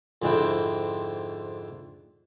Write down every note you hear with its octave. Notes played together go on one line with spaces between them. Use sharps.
F2 G#2 D3 C4 E4 G5